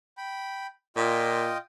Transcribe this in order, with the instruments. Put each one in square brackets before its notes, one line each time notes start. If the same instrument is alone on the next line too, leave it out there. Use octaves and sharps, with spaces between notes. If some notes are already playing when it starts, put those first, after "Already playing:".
[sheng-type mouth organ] G5 B5
[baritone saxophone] A#2 [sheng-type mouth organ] F4 D#5 G5